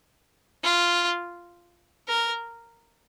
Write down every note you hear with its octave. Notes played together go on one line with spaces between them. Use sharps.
F4
A#4